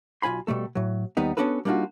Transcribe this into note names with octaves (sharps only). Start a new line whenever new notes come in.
B1 F4 G#5 B5 C6
B2 G3 A3 A4
A2 F#3
D#2 G3 B3 D#4
B3 C#4 D4 F#4 A4 B4
G3 A#3 D4 D#4 F4 F#4